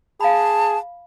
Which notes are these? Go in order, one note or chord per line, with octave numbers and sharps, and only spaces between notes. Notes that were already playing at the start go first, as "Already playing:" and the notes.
G#4 F5 A5 B5